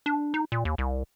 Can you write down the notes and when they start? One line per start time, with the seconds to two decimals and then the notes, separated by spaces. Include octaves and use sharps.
0.06 D4
0.34 D#4
0.52 A#2
0.65 D#2
0.78 C2